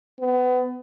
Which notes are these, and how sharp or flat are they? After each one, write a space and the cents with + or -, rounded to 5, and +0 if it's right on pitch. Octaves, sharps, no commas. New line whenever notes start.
B3 +30